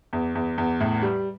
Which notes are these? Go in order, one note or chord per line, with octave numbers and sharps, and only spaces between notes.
E2
E2
E2
A2
G3